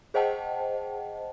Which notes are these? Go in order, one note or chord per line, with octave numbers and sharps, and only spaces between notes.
G#4 C5 D#5 F#5 G5 A5